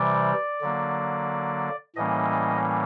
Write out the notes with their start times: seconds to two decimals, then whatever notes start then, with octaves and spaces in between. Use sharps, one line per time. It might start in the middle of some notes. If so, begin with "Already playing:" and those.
Already playing: C3 E3 G3 D5
0.61 D3 F#3 A#3
1.95 A2 E3 G3 A#3 C#4 D#5